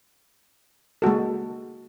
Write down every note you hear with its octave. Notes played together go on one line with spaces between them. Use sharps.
G#3 A#3 F#4 A4